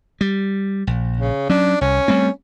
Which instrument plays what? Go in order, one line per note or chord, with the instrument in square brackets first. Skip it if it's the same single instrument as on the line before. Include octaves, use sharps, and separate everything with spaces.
[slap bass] G3
A#1
[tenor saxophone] C#3
[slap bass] F#3 C#4 [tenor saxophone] D4
[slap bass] C2 [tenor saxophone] C#4
[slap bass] G3 A3 C4